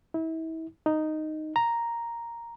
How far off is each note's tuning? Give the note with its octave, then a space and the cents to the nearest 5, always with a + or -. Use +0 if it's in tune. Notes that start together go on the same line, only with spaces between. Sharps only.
E4 -35
D#4 -5
A#5 +0